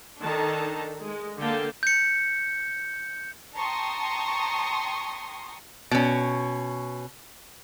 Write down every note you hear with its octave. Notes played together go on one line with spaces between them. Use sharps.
D#3 D4 D#4 A4 A5 A#5
G#3
D3 A#3 F5 G5 A5
G6 C#7
G5 A5 A#5 C6 C#6 D#6
B2 C#4